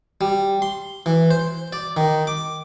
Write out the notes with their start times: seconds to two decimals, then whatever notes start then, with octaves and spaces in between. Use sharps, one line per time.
0.21 G3
0.62 C6
1.06 E3
1.31 C5
1.73 D5
1.97 D#3
2.27 D6